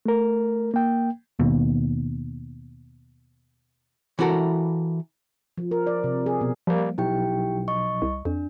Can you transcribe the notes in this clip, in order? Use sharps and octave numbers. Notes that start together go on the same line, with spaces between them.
A3 A#4
A#3 G5
D#2 B2
E3 E4 F#4 A4 A#4
F3
A#4
D5
C3
G#4
B2
F3 G3 A#3
B1 E4 G4 G5
D#5 C#6
C2
F2 D4